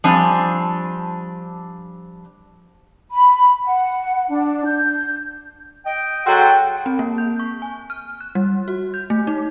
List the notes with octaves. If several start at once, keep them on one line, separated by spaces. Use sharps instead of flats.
F3 G3 C4 D4 G#5
B5
F#5
D4
G6
D#5 G5
F#3 F#4 G#4 A4 G5 C6
C4
A#3
G6
C#6
G#5
F6
F#6
G3
F#4
G6
A3
D#4